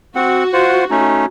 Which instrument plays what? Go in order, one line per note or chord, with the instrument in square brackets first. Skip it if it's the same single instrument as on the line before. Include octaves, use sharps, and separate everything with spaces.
[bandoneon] C4 F#5 [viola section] F#4
[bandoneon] F4 C5 F#5
A3 C#4 D#4